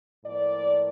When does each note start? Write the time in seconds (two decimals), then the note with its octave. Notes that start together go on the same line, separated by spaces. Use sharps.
0.24 A2 F3 A#3 D5